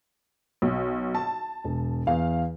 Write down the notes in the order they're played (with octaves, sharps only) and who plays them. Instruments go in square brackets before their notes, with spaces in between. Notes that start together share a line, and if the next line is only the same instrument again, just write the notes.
[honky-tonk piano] B1
A5
[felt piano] E1
[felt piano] E2 [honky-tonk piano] F5